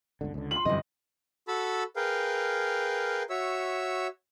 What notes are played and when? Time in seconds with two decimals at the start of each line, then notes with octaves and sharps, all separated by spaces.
0.21 G1 C#2 D3
0.34 C#2 D3
0.51 F4 B5 C6 F#7
0.65 G1 F#2 C3 E3 D#5
1.48 F#4 A4 A5 B5 E6
1.96 G#4 A#4 B4 F5 G5
3.30 F#4 C#5 E5 E6